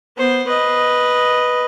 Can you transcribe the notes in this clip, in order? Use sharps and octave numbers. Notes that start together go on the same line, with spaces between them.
B3 C5
B4 D#5